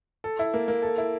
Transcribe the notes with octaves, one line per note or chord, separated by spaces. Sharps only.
A4
E4
A#3
A#3
A4
E4